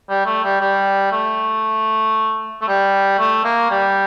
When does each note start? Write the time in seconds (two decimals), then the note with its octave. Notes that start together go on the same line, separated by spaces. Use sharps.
0.09 G3
0.26 A3
0.44 G3
0.61 G3
1.12 A3
2.62 A3
2.68 G3
3.19 A3
3.44 A#3
3.70 G3